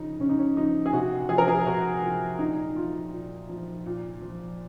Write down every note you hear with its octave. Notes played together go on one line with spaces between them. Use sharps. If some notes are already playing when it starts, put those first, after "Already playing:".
Already playing: C#3 F3 D#4
C#3 C#4
D#4
C#4
F3 D#4
G#4
C3 F#4
F3 G#4
A#4
G#4
C3 F#4
F3
A#2 D#4
F3 F4
A#2
F3
A#2
F3